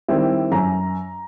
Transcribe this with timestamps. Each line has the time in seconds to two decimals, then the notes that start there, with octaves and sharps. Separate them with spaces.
0.08 D#3 G3 C4 E4
0.51 F#2 A#5